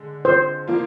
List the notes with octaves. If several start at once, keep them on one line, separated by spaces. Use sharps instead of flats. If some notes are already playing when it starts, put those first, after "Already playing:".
Already playing: D3 G#3
C5
F3 A#3 F4